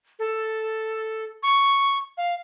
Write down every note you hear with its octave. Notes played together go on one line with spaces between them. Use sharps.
A4
C#6
F5